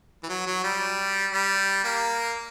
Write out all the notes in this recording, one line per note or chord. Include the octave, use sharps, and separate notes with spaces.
E3
F#3
F#3
G3
G3
A#3